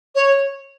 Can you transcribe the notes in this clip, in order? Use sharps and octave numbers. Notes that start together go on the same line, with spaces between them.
C#5